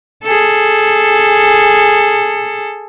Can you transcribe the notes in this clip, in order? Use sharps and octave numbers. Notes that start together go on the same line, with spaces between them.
G#4 A4